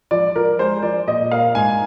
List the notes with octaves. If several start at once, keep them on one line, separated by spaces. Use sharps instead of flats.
F3 D5
F3 A#4
G#3 C5
F3 D5
A#2 D#5
A#3 F5
G#2 G#5